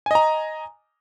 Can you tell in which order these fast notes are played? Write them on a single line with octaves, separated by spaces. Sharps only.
G#5 D#5 A#5